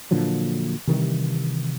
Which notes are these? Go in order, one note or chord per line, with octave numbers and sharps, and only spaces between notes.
A#2 D3 F3 F#3
C3 D#3 E3 G3